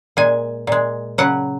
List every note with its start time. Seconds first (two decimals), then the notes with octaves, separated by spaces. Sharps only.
0.17 A#2 G#3 G#5
0.67 A#2 G#3
1.18 C#3 F#3 F#5